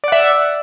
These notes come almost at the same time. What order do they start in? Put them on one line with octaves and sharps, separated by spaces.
D5 F#5 E5